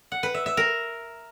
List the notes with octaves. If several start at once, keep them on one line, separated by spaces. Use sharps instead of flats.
F#5
B4
E5
E5
A#4